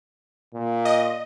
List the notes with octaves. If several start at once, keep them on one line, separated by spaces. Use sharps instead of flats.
A#2
D#5